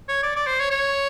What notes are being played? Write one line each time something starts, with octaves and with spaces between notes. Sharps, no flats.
C#5
D5
D5
C5
C#5
C#5